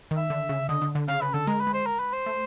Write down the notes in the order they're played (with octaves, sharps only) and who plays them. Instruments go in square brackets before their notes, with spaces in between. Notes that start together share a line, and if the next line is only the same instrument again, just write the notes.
[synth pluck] D#3
[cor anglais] E5
[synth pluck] D3
C#3
[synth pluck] D3 [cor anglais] D#5
[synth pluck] D3
D3
[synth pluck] C#3 [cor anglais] F5
[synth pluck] C#3 [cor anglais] B4
[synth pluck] D3 [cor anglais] A4
[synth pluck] G#3 [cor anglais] A#4
[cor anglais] B4
[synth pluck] G#3
[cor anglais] C5
A#4
B4
C5
[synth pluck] A3